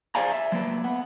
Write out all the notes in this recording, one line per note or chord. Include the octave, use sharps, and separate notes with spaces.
G#4 C5 D5 F5 G#5 A#5
E5
F#3 A#3 B4
B3